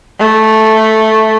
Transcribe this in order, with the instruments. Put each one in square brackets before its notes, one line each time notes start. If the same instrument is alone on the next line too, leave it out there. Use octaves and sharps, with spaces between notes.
[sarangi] A3